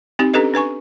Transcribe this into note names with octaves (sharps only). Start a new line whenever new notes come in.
C4 D#4 G4
C#4 D4 G4 A4 B4 D#5
D4 B4 G#5 C#6